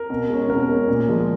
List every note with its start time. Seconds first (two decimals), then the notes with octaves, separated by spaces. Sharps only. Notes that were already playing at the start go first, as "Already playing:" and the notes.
Already playing: A#4
0.10 B2
0.29 G#3 C#4
0.49 B2 A#4
0.68 G#3 C#4
0.89 A#2
1.08 F3 G#3